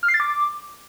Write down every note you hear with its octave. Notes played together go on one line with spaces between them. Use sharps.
F6
C7
A6
D6